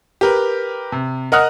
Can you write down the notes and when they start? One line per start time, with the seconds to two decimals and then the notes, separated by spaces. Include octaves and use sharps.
0.21 G4 A#4 B4
0.92 C3
1.32 A#4 D#5 F#5 D#6 F6 F#6